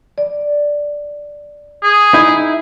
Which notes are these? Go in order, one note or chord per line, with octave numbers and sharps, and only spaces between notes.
D5
G#4
D#4 E4